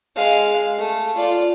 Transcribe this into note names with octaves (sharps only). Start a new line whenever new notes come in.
G#3 F5
A3
F4 D5